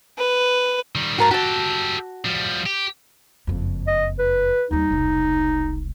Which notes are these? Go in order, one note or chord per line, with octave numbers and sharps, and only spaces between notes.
B4
D#3 G3
G#2 F#4 A#4 A5
F#4 G4 A4 A5
F3 G3
G4
F#1 F2
D#5
B4
D#2 G3 D#4
E1 C2